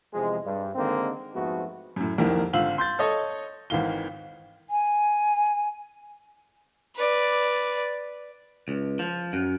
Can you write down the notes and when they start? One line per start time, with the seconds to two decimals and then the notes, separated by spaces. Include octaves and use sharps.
0.14 E2 C3 F3 G#3
0.45 G2
0.75 D3 D#3 G#3 A#3 C4
1.34 F2 G#2 F3 A3 B3 F#4
1.96 F#2 A2
2.18 C2 F2 D#3 A#3 E4
2.53 G#1 D3 F4 F5 E6 F#7
2.78 C6 G6 A6
2.99 A4 C#5 D#5 C#6
3.70 G#1 D#3 E3 F5 G7
4.70 G#5
6.96 B4 D5
8.68 C#2
8.99 F3
9.33 F#2